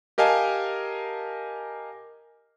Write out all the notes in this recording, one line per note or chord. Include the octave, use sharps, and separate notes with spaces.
G4 A#4 D#5 F5 G#5 A5